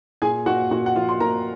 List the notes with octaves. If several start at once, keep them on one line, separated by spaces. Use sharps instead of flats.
A#2 G#4 G#5
A#2 F#4 F#5
A#2 F#4 F#5
F#5
F3 F4 F5
C6
A#2 A#4 A#5